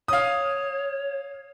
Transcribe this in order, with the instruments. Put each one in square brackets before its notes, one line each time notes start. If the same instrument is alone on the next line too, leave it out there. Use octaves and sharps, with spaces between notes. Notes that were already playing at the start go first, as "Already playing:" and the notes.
[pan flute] C#5 [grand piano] F5 D#6